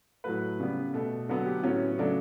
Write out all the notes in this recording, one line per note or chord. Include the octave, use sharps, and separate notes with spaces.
A2 F#3 A3 B4
C#3 G3 B3
B2 A3
D3 F#3 B3 A4
G4
A2 F#3 B3 C#4
C#3 F#3 A3 D4